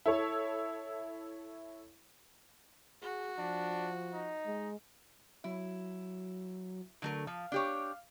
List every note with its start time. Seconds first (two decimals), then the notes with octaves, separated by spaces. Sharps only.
0.06 E4 A4 C#5
3.02 F#4 G#4
3.39 F3 D4
4.13 D#4
4.46 G#3
5.44 F#3 E4
7.02 D3 F#3 A3 A#4
7.27 F3 F5
7.52 D4 G4 C#5